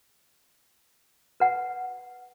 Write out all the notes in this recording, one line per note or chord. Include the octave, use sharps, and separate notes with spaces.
B4 F#5